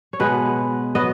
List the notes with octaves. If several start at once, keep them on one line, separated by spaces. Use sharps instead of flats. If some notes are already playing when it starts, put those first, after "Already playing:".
C#5
B2 G#3 B3 B4
F#3 B3 D#5